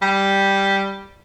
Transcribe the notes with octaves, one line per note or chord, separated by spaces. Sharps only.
G3